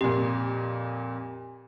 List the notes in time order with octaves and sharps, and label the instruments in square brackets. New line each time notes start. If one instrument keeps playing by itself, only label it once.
[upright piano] F2 A#2 [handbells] G4